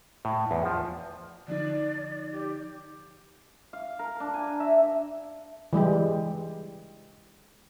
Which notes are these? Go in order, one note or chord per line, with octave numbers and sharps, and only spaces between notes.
A2
E2
F3
D3 F3 D#4 D5
G4
F5
A#4
D4
G#5
E5
E3 G3 G#3 G4